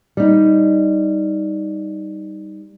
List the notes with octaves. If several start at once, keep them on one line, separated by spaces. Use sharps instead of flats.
G3 D#4